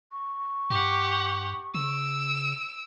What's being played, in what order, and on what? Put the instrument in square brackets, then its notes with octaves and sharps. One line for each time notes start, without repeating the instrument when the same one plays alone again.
[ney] C#6
[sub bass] G2 [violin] G4 F#5
[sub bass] C#3 [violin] E6 D7